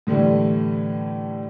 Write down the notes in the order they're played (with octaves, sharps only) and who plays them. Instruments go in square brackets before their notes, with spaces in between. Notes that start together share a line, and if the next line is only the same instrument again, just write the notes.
[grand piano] A2 D3 E3 G3 A3